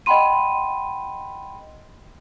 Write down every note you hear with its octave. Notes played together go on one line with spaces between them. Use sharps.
D#5 F#5 G5 B5 C6 D#7